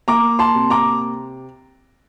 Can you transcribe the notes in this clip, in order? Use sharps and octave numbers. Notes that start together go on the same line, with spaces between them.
A#3 A#5 D6
A5 C6
C3
A#5 D6